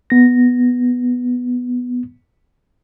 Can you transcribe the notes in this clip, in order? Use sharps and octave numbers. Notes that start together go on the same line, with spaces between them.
B3 A#6